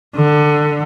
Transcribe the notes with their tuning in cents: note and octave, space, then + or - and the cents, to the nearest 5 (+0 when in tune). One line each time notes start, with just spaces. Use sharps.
D3 +20